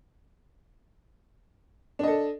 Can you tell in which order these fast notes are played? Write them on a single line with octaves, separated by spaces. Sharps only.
D4 D#5 A4